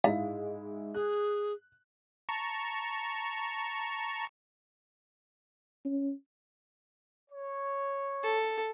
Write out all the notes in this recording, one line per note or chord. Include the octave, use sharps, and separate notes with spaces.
G#2 G#3 E4 F5
G#4 F#6
A5 A#5 C#6
C#4
C#5
A4